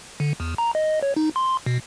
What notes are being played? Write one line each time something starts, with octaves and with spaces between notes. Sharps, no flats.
D3
E2
A#5
D#5
C#5
D#4
C6
B2